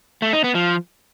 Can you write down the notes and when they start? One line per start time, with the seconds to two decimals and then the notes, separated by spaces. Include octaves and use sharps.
0.22 A3
0.33 D#4
0.44 B3
0.55 F3